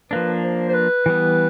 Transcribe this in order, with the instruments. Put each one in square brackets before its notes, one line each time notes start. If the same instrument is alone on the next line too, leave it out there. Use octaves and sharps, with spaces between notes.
[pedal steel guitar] F3 A#3 D4 [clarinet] B4
[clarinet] C5
C5
B4
[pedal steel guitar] E3 G3 B3